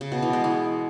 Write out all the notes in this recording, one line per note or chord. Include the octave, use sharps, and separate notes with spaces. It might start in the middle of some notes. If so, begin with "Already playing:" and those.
C#3
B2
E3
G#3
E3